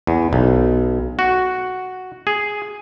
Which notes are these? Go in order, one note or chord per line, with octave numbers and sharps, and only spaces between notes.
E2
B1
F#4
G#4